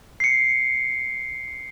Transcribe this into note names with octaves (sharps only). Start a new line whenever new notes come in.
C7 C#7